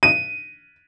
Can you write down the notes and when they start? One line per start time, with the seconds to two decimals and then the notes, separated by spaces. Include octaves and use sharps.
0.03 D#7